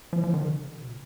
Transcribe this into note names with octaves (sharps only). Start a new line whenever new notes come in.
F3
F3
D#3
C#3
B2
A#2